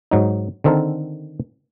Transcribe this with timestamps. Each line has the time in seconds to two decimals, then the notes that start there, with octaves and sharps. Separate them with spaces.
0.11 G#2 F#3 D#4
0.64 D3 D#3 C4 A4 A#4